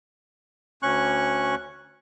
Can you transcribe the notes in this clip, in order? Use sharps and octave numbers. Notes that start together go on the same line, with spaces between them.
D2 C#4 C#6 F#6